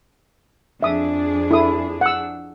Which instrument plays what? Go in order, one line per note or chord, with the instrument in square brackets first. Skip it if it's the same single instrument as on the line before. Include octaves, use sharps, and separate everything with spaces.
[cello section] F2 D4 G#4 [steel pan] E5 D#6
[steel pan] E4 A4 D#6
F#5 E6